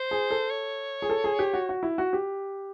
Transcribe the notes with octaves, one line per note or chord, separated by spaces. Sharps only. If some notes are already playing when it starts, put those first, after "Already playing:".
Already playing: C5
G#4
A4
C#5
G#4
A4
G#4
G4
F#4
F#4
E4
F#4
G4